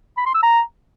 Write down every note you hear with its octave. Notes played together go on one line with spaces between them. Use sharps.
B5
C6
E6
A#5